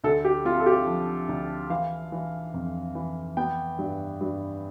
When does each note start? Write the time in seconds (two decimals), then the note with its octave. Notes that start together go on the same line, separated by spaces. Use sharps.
0.04 D2 A4
0.25 G4
0.45 C4 F4
0.60 A4
0.66 G4
0.87 F3
1.29 D2
1.70 E3 F5
2.12 E3
2.54 F2
2.95 E3
3.37 B3 G5
3.78 G2
4.21 G2